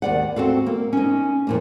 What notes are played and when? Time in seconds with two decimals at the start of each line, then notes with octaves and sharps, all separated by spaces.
0.02 D#2 D5 F#5
0.36 C4 F#4 A4 F5
0.66 A#3
0.93 C#4 D#4
1.47 F2 A#2 A#3